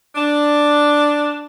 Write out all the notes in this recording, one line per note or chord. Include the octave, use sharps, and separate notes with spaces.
D4